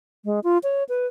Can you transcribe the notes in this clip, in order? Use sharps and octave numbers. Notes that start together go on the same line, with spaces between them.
G#3
F4
C#5
B4